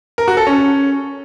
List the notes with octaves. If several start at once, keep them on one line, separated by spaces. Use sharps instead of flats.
A#4
F#4
A4
C#4